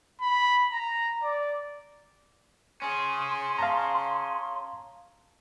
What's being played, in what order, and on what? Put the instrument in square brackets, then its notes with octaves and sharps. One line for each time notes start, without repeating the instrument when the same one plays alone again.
[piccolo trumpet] B5
A#5
D5
[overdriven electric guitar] C#4 G#4 [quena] C6
[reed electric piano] F5 A5 A#5